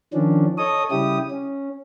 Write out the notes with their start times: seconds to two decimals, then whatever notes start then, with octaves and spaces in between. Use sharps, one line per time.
0.13 D#3 F3 C#4 D4
0.58 A4 C#5 D#5 D#6
0.91 C#3 G3 E4 G4 D#6
1.30 C#4